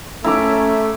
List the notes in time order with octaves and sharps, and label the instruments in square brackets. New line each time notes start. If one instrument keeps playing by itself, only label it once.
[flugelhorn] A3 [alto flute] C#4 [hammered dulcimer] E4 A#5 D6 [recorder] E5